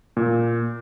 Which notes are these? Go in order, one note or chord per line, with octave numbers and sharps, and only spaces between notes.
A#2